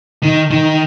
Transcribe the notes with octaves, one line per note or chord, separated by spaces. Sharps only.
D#3
D#3